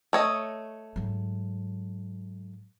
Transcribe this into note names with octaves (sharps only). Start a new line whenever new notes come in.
A3 C#5 D#5
G#2 F#3